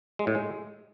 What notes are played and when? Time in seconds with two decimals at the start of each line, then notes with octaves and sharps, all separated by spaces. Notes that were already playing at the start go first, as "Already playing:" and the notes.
0.19 G#3
0.27 A2
0.35 G#3